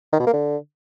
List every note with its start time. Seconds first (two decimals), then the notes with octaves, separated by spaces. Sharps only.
0.13 D#3
0.20 B2
0.27 A#3
0.34 D3